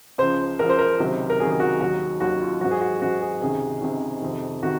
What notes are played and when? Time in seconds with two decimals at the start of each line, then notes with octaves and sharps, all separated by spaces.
0.18 C#2 C#3 F3 C5
0.59 C#2 C#3 F3 A#4
0.69 C5
0.78 A#4
0.99 C#2 C3 D#3 F#3
1.30 A#4
1.40 C#2 C3 D#3 F#3 G#4
1.50 G#4
1.60 F#4
1.80 D#2 D#3 F#3 F#4
2.20 D#2 D#3 F#3 F#4
2.41 F4
2.61 G#2 F#3 F#4
2.71 G#4
2.81 F#4
3.02 G#2 F#3 F#4
3.21 G#4
3.41 C#2 C3 D#3 G#4
3.81 C#2 C3 D#3
4.22 F2 C3 D#3
4.63 C3 D#3 F#4